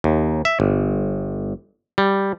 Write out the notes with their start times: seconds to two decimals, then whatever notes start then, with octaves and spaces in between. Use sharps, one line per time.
0.04 D#2
0.45 E5
0.60 G1
1.98 G3